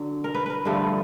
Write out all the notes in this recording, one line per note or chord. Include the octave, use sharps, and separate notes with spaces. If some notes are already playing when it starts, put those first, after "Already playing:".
Already playing: D3 F#3
A#4
B4
A#4 B4
G2 D3 F3 A3 B4